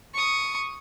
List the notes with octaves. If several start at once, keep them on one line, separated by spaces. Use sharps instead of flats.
C#6 D#6